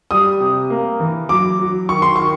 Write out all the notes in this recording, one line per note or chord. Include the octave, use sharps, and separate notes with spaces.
G3 D#6
C3
A#3
E3
F#3 D6
F#3
D#3 C#6
C6
D#3 C#6